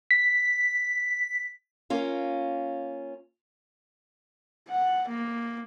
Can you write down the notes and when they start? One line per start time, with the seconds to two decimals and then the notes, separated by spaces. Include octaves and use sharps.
0.11 B6
1.90 A#3 C#4 F4
4.69 F#5
5.08 A#3